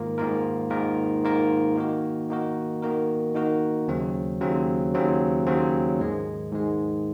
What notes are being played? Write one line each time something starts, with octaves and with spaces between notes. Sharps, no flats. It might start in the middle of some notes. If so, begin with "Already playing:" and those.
Already playing: G#2 D#3 A#3 F4 A#4
G#2 D#3 A#3 F4 A#4
G#2 D#3 A#3 F4 A#4
G#2 D#3 A#3 F4 A#4
D#3 A#3 D#4 F#4 A#4
D#3 A#3 D#4 F#4 A#4
D#3 A#3 D#4 F#4 A#4
D#3 A#3 D#4 F#4 A#4
D#2 C#3 F#3 C4
D#2 C#3 F#3 C4
D#2 C#3 F#3 C4
D#2 C#3 F#3 C4
G#2 D#3 G#3
G#2 D#3 G#3